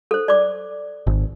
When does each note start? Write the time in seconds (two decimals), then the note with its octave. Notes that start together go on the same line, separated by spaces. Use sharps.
0.11 A4 C5
0.28 D5 D6
1.07 G#1